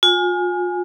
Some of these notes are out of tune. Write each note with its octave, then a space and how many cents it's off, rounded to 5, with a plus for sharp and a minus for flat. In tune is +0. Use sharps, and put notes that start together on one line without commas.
F4 +35 G#5 +0